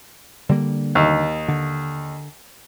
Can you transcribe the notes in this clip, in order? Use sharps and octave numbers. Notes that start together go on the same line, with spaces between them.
D3 G3 A#3
D#2
D3